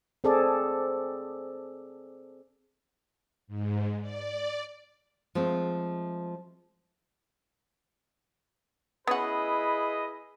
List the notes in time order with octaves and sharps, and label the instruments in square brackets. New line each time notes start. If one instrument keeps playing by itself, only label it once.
[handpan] C4 G#4 A4 D5
[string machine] G#2
D5
[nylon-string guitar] F3 G#3 A3 C4
[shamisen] B3 C#4 F#4 [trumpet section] E4 B4 B5 [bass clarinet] G#4 [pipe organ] D#5